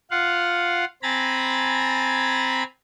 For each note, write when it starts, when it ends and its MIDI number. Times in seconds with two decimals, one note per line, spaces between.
0.11 0.85 65
0.11 0.85 77
0.11 0.85 78
1.03 2.63 60
1.03 2.63 80
1.03 2.63 82
1.03 2.63 83
1.03 2.63 93